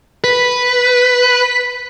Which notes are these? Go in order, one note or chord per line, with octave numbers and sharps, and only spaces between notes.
B4 B6